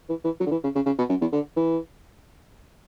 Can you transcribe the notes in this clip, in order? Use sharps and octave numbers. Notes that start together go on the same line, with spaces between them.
E3
E3
F#3
D3
E3
C#3
C#3
C#3
B2
F#2
E2
D3
E3